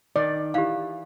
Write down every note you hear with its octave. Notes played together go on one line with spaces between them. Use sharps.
D#3 D5
E3 G4 F5